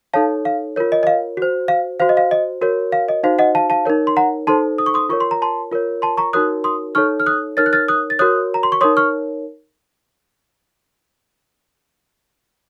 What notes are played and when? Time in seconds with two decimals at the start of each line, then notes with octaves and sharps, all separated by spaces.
0.13 D#4 A4 C#5 F5 A5
0.45 F5
0.76 F4 A#4 C#5
0.92 D#5
1.03 D#5
1.07 F5
1.37 F#4 C5
1.68 F5
2.00 F#4 C5 F5
2.09 D#5
2.17 F5
2.31 D#5
2.61 F#4 A#4 C#5
2.92 F5
3.08 D#5
3.23 D#4 F#4 C5 F5
3.39 D#5 F#5
3.55 F5 A5
3.70 F5 A5
3.86 D#4 A#4 C#5
4.07 C6
4.17 F#5 A#5
4.47 D#4 A4 C5 A5 C6
4.78 D#6
4.86 C#6
4.94 C6 D#6
5.09 F4 A#4 C#5 C#6
5.20 C6
5.31 A#5
5.42 A5 C6
5.72 F4 A#4 C#5
6.02 A5 C6
6.17 A#5 C#6
6.33 D#4 F#4 A#4 C#5 D#6 F#6
6.64 C6 D#6
6.95 D#4 A4 C#5 C#6 F6
7.20 F6
7.26 D#6 F#6
7.57 D#4 A#4 C#5 F6 A6
7.66 F#6
7.73 F6 A6
7.88 D#6 F#6
8.10 A6
8.19 F#4 A#4 C#5 D#6 F#6
8.54 A#5
8.63 C6
8.72 C#6
8.81 D#4 A#4 C#5 C6 D#6
8.97 C#6 F6